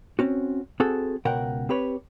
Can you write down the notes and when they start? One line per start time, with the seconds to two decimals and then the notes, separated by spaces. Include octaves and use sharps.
0.19 C4 C#4 F#4
0.80 C4 F#4 G#4 A4
1.25 C#2 B2 A#4 F#5 G5
1.69 C4 G4 B4 C#5